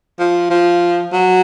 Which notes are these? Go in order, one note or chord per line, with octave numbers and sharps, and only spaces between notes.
F3
F3
F#3